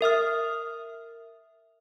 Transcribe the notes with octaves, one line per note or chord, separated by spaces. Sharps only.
A#4 E5 D#6 F6